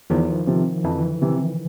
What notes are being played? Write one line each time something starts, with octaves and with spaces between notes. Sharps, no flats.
E2 D#3 F3
C3 F3
F2 D3 E3
C3 E3